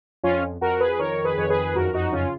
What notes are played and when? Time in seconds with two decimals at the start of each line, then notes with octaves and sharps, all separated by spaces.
0.23 F2 C#4 F4
0.61 F2 F#4 A#4
0.80 G#4 B4
0.99 D#3 A#4 C#5
1.24 G#4 B4
1.37 F2 C#5
1.50 G#4 B4
1.75 F#2 F#4 A#4
1.94 D#4 F#4
2.13 C#3 C#4 F4